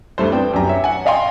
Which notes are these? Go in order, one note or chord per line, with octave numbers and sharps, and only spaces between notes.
G2 A3 C5
B3 C4 D4 G5
F#2 G4 A#5
C#5 E5
F#5 G#5
D5 D#5 F5 G5 G#5 C6